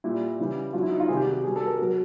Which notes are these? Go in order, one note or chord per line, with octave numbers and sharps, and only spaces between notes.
A#2 G3 E4
C#3 E3 G3
B2 F#3 F4
E4
D#4
F4
C3 D#3 G3 G#4
G4
F#4
G4
B2 G3 G#4
A4
A#4
B2 F#3 A#4